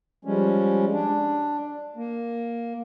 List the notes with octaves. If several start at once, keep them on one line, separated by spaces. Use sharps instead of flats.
F3 G3 G#3 C#4
D4
A#3